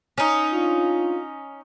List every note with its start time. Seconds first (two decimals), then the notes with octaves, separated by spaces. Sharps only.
0.18 C#4 D#4
0.52 D4 F4